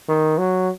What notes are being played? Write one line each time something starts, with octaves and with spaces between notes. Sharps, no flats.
D#3
F#3